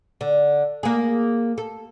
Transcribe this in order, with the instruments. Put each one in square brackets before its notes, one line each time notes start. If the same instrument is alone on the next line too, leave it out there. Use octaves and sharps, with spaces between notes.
[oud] D3
A#3 G#4
A4